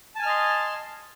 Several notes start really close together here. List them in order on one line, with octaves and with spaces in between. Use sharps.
A5 G#5 F6 D#5 C6